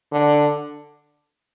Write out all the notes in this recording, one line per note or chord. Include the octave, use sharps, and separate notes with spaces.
D3